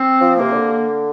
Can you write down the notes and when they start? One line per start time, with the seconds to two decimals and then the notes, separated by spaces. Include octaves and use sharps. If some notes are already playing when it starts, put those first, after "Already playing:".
Already playing: C4
0.21 F3
0.36 C3 A#3
0.52 D3